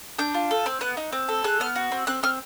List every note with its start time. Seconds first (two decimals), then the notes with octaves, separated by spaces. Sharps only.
0.19 D4 G6
0.34 F4
0.51 A4
0.66 C4
0.81 B3 F#6
0.97 D#4
1.12 C4
1.28 A4
1.44 G#4 F#6
1.60 B3 F6
1.76 F#4
1.92 C4
2.07 C4 F#6
2.23 C4 F6